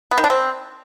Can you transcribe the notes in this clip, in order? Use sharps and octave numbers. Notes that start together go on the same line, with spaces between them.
B3
D#3
D4
C4